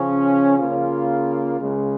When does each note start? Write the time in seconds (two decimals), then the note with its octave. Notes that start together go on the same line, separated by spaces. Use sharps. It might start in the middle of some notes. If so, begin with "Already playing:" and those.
Already playing: C#3 F3 C#4
0.58 C#3 A#3 F4
1.59 C#2 C#3 G#3